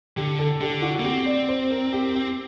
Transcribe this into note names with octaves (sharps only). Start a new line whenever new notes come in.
D3 G4
A4
D3 G4
F#4
A#3
C4 G4
D5
C5
A#4
G4
G4